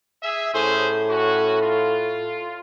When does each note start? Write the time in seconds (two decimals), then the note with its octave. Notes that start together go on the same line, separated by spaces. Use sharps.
0.23 G#4 E5
0.54 A2 C#4 G#4 C5
1.10 C#4 F#4
1.61 F4